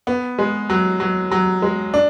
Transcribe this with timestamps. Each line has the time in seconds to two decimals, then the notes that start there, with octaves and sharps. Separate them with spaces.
0.07 B3
0.39 G#3
0.70 F#3
1.00 F#3
1.31 F#3
1.62 G#3
1.94 D4